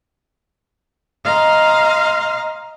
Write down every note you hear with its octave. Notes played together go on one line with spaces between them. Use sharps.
D#5 F5 A#5 C6